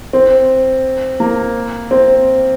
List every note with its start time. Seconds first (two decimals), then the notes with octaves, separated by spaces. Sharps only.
0.13 C4
1.20 A#3
1.91 C4